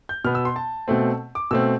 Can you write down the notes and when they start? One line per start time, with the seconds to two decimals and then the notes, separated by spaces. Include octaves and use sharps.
0.09 G6
0.24 B2 B3 F6
0.35 E6
0.45 C6
0.56 A5
0.88 B2 A3 C4
1.35 D6
1.51 B2 A3 C4 E6